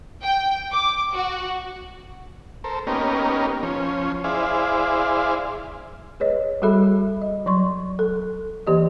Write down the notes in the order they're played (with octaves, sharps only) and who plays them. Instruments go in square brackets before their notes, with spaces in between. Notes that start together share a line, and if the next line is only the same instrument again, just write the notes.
[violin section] G5
D6
F#4
[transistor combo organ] A4 A#4 C5
A#3 B3 C#4 D#4 G4 A#4
F3 C#4
E4 G#4 C5 D5 F5
[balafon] G#4 B4 C#5 D#5
G3 F#4 G#4 A4 E5 B5
D#5
F#3 C6 C#6
A4
E3 A#3 G4 D5 D#5